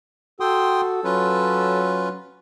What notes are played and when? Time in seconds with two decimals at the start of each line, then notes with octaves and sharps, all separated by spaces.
0.40 F#4 A4 G5 C6 D#6
1.04 F#3 C#4 F4 B4